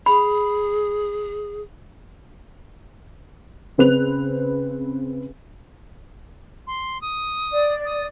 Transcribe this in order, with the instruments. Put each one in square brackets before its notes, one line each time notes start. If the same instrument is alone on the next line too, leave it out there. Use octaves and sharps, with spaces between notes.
[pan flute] G#4 [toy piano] B5
[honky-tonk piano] C#3 C4 B4 F#6 F7
[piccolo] C6
D#6
[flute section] D5
[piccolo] D#6